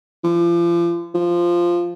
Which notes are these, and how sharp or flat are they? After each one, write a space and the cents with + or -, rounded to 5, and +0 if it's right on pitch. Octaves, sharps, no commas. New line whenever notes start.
F3 -35
F3 -5